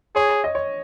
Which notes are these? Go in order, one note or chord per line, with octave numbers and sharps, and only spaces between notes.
G#4 C#5
D#5
C#5